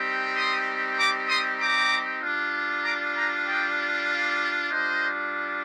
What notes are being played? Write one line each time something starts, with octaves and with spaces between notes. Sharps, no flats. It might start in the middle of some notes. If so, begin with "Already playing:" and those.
Already playing: G3 C4 D#4 G4
C6 D#6
A#5 D6
C6 D#6
A#5 D6
G3 D4 F4
A#5 D6
G5 A#5
D#5 G5
D5 F5
G3 D4 F4 C5 D#5